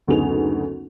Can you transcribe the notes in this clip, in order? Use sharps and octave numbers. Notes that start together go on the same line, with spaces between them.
F#1 D2 B3 D#4 G#4 F7